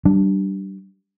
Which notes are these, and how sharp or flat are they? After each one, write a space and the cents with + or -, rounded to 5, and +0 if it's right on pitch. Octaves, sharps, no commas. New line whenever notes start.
G3 -25 D4 +0